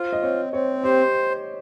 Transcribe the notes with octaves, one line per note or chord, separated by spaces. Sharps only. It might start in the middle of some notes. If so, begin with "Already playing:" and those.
Already playing: F4 C5
D#5
C4 C#5
C4 C#5
G4 C5